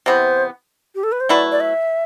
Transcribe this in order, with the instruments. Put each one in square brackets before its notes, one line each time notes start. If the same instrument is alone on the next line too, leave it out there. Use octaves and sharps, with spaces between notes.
[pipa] C3 E3 B3 [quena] C5
[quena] G4
A4
B4
C5
[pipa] F#3 A3 E4 B4 [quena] D5
[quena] D5
E5